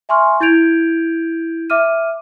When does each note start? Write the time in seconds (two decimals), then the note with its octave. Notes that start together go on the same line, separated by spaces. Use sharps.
0.09 E5 G#5 C6 C#6 F6
0.40 E4 G6 G#6 D7 F7
1.70 E5 D6 F6 D#7